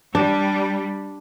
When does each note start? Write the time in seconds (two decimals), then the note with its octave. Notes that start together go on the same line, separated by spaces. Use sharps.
0.15 G3 D4